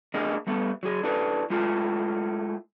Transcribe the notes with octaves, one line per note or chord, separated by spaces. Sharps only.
A3 D4 G#4 A#4 D#5
G3 A3 B3
F#3 G#4
D4 E4 A4 B4
G#3 A3 E4 F4